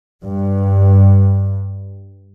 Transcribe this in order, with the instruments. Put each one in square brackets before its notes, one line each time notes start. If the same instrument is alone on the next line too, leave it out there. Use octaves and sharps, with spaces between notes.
[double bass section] G2